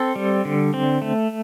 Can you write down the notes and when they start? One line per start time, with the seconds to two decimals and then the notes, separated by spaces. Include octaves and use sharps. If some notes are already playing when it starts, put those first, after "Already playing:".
Already playing: C4 A4
0.16 G3
0.45 D3
0.74 C4
1.02 A3